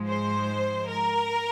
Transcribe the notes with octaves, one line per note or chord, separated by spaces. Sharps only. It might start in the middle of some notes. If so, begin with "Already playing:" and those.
Already playing: G#2 F3 G#3
C5
A#4